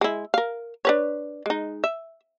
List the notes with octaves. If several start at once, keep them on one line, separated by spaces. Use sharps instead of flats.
G#3 E4
A#4 F5
D4 B4 C#5
G#3 D#4
E5